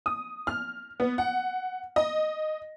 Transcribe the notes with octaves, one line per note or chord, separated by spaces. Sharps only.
D#6
F6
B3
F#5
D#5